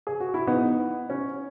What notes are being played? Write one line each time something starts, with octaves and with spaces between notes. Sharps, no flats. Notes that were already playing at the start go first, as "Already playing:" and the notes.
G#4
F#4
E4
B3 D#4
C#4